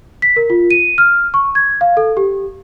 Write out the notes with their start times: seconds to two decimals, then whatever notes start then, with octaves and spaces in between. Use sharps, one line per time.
0.22 B6
0.36 A#4
0.50 F4
0.71 D#7
0.98 F6
1.34 C#6
1.55 G#6
1.81 F5
1.97 A4
2.17 G4